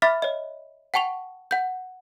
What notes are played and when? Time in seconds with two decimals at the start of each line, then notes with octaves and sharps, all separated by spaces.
0.02 E5 B5 D6 F6 A6 B6
0.22 C#5 D#5
0.94 F#5 G5 A5 C#6 F7
1.51 F#5 G6